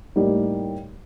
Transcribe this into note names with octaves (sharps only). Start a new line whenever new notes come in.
A2 G3 A#3 D#4 G4